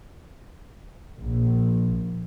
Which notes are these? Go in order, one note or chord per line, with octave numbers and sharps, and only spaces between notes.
A#1